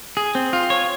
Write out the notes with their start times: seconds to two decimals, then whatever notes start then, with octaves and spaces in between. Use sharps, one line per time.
0.17 G#4
0.35 C4
0.53 F4
0.70 C#5